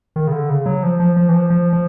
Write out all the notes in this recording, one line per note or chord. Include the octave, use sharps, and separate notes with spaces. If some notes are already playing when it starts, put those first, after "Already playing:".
D#3
C#3
D3
C#3
F#3
F3
F3
F3
E3
F3
F3
F3